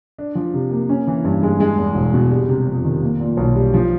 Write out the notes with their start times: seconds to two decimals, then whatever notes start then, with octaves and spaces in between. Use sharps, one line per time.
0.18 D4
0.35 F3
0.54 C3
0.71 A#3
0.89 C#4
1.07 E3
1.25 G2
1.43 G#3
1.60 G#3
1.77 E2
1.95 E1
2.14 B2
2.31 G3
2.49 C3
2.67 F2
2.84 D#3
3.02 A#3
3.20 A#2
3.37 B1
3.55 G3
3.74 F3